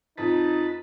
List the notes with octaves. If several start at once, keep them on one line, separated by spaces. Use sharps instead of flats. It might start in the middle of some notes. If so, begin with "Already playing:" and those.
F2 D#4 B4 A5